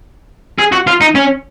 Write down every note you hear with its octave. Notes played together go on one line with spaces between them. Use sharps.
G#4
F#4
F4
D#4
C#4